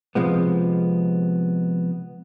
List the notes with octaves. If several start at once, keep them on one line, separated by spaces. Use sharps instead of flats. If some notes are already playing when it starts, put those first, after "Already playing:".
C3 F3 G#3 B3